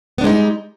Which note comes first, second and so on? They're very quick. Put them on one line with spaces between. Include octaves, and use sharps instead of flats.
B3 D4 G#3 D#4 G3